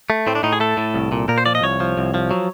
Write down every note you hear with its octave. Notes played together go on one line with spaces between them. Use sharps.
A3
A2 C4
D4
A2 D#4
G#4
A3 A4
A2
C2
A#2
A#2 A#4
C5
F3 D5
D#5
C2 C#5
F3
C2
F3
F#3